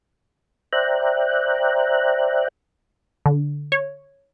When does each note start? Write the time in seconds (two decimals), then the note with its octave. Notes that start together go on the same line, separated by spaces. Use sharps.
0.73 C5 D5 E5 G5 A#5 F#6
3.26 D3
3.72 C#5